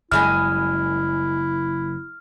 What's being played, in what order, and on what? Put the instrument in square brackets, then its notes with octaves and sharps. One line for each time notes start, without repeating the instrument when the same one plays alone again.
[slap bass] F#1 F#2 [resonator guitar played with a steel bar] G3 G#3 G#5 [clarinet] E4 [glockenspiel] F6